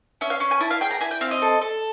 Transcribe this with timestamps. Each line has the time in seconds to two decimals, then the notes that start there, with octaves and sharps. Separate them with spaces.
0.21 C#4 E5
0.30 F5
0.40 C#4
0.51 G#5
0.61 E4 A5
0.71 F5
0.81 G#4 G5
0.91 A#5
1.01 E4 G#5
1.11 G5
1.21 C4 F5
1.31 D#5
1.42 A4
1.61 A4